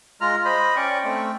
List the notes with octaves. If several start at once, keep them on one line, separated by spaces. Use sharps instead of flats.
G#3 F4 A#5 F6
C5 D#5 B5
C#4 D5 G5 C#6
A3 C4